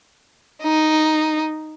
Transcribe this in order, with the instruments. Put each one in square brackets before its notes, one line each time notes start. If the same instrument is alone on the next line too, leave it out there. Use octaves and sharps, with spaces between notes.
[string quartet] D#4